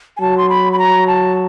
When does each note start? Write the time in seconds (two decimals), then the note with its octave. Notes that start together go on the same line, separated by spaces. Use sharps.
0.17 G#5
0.21 F#3 A5
0.38 C6
0.49 B5
0.73 B5
0.79 A#5
1.07 A5